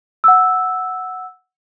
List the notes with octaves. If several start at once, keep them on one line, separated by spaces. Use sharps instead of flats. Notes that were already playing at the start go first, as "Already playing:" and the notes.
F#5 E6